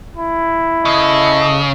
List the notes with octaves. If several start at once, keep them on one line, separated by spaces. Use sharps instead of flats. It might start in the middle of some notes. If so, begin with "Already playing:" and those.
E4
C#3 A4 D#5